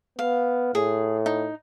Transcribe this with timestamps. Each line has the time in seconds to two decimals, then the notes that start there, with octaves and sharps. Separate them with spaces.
0.19 B3 F5
0.75 A2 G#4
1.26 D#4